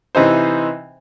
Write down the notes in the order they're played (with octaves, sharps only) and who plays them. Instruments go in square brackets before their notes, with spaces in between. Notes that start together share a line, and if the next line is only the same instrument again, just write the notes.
[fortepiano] C3 E3 D#4 C5